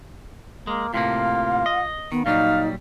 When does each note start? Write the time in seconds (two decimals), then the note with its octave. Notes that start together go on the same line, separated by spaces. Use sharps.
0.67 G#3 A#3
0.94 A2 C3 A#3 F4 F5
1.66 D#5
2.12 D#3 B3
2.26 A#2 F#3 G3 D#4 F5